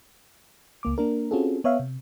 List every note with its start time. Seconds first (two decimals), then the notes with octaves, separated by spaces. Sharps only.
0.83 C#2 A#3 D6
0.98 A#3 D4 A#4
1.31 C4 C#4 F4 F#4 G#4 A4
1.64 B3 C#5 E5 F5
1.80 C3